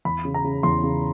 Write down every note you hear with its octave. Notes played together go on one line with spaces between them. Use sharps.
E2 B5
C#3
A#5
C#3
E2 C6
C#3